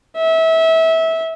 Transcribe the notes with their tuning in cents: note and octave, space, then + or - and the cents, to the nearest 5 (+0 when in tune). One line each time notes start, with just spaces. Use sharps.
E5 -25